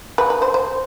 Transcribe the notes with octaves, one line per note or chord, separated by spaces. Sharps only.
B4
B4
C5
C5